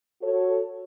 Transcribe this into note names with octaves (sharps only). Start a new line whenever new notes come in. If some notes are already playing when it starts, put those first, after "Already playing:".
F#4 A4 C#5